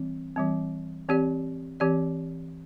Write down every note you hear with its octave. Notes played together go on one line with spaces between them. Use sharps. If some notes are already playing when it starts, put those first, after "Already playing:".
Already playing: E3 G3 C4
E3 G3 C4
E3 C4 G4 D5
E3 C4 G4 D5